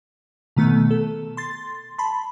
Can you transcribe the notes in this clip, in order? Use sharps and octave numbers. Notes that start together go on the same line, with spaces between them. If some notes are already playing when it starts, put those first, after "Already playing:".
B2 D#3 A3 B3
A4
C6 A6
A5 B5 C6